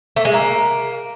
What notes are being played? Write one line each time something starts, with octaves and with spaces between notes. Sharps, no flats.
A3
G#3
A#3